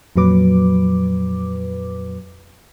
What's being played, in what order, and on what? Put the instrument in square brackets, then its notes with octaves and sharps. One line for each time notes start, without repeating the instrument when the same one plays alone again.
[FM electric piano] F2 A#2 F#3 B4 D6